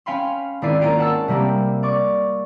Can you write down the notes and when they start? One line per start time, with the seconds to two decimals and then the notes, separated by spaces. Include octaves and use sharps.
0.06 C#4 F5 G5 G#5 B5 C6
0.62 G#1 C4 E4 D5 C7 D#7
0.81 A#3 C#4 F4 D7
0.98 F#5 A5 E6
1.28 C3 G3 A#3 C4
1.83 D5 C#6 D6